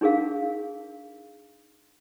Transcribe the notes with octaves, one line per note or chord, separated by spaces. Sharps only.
D4 D#4 G#4 A#4 F5